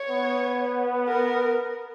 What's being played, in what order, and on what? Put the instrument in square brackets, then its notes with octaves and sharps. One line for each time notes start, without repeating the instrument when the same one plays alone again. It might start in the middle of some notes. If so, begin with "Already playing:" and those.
Already playing: [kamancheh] C#5
[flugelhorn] B3
[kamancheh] A#4